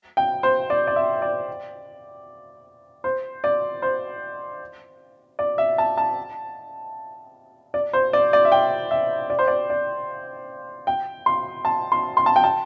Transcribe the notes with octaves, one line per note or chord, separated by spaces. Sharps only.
G5
C5
D5
D5
E5
D5
C5
D5
C5
D5
E5
A5
A5
D5
C5
D5
D5
E5
G5
E5
D5
C5
D5
D5
G5
C6
A5
C6
C6
A5
G5
A5